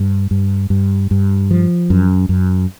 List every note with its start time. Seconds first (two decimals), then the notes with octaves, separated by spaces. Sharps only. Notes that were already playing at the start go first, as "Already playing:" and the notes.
Already playing: G2
0.31 G2
0.70 G2
1.11 G2
1.51 F3
1.90 F#2
2.29 F#2